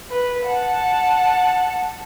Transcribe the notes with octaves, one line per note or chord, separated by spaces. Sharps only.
B4
F#5 A5